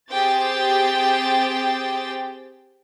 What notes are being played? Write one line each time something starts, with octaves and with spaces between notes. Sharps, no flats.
C4 G4 G#4 C5 G5 A6